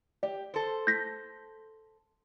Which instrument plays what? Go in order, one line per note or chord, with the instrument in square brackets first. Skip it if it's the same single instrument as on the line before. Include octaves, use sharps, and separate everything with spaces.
[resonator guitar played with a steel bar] G4 [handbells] D5
[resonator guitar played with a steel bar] A4 C5
[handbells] G6 A#6 B6